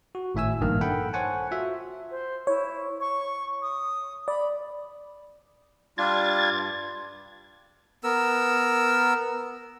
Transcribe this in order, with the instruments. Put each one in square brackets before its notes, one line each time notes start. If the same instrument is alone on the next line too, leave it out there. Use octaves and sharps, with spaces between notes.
[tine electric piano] F#4
G#1 A2 E5 G#5 E6
A#1 G2 D#3 A#3 F6
A4 F#5 G5 B5
C5 C#5 F#5 G#5 A5
F4 F#4 E5
[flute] C5
[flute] E4 [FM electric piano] C#5
[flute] C#6
D#6
[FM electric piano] D5 [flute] B5
[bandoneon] G3 D4 F4 [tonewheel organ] G#6 A6
[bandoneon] G2
[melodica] B3 A#4 E6